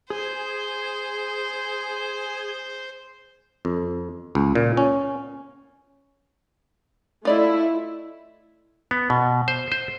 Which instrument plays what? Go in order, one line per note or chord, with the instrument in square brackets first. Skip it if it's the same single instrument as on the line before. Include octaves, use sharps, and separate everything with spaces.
[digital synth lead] G#4 [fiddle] C5
[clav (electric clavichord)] F2
C#2
A#2
C#4
[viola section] A3 E4 [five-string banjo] F4 D5 D#5
[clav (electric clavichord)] B3
B2
C5
C5